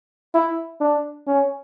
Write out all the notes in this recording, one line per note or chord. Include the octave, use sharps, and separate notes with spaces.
E4
D4
C#4